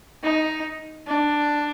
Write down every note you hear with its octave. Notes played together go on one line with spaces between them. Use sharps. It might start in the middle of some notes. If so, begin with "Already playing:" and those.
D#4
D4